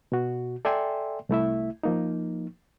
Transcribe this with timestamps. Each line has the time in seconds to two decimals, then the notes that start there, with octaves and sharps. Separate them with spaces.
0.12 B2 F#4
0.65 A4 D5 E5 G5 G#5 C6
1.29 C2 A3 E4 E5
1.83 F3 A#3 D#4